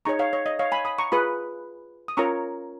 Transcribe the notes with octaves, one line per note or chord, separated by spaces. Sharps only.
D#4 G#4 C#5 A#5 C#6
C#5 F5
C#5
D#5
C#5 F5
G#5 B5
B5 D#6
A#5 C#6
F4 G#4 B4 B5 D#6
D#6
C#4 F4 A#4 C#5 A#5 C#6